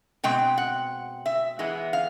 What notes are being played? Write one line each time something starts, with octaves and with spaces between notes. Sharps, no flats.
B2 G#3 C4 G5
F#5
E5
E3 G#3 B3
F5